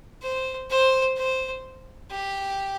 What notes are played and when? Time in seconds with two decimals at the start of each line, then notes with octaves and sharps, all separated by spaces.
0.22 C5
0.70 C5
1.17 C5
2.10 G4